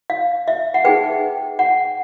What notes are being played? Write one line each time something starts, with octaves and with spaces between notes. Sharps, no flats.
F5
E5
F#5
D#4 G#4 B4 G5
F#5